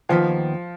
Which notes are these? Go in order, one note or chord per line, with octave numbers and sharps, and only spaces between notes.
D#2 D#3 F3 B3